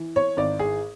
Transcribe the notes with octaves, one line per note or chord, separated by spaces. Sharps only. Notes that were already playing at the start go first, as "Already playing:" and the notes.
Already playing: E3
C#5
G#1 D5
G#4